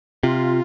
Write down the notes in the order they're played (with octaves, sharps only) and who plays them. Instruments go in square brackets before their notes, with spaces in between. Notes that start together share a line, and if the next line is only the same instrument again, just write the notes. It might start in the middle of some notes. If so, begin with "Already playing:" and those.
[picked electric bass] C3 [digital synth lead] F4